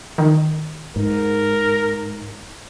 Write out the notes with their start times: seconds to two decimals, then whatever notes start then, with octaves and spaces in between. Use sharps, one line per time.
0.18 D#3
0.96 G#2 A#4